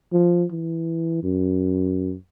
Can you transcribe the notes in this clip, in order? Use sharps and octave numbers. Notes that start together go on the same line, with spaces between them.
F3
E3
F#2